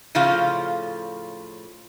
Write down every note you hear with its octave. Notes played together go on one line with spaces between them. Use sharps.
A2 C#3 F3 F4 F5